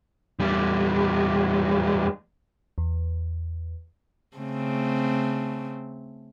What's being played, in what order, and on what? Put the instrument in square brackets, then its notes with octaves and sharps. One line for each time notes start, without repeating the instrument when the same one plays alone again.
[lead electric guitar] E2 G3
[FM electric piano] E2
[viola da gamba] C#3 A3 C4